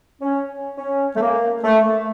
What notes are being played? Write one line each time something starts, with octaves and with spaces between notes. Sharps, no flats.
C#4
C#4
A3
A#3
A3